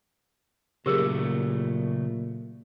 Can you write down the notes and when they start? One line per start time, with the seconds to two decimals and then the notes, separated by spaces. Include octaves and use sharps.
0.86 A#2 C#3 F#3 A3 G4 G#4 A#4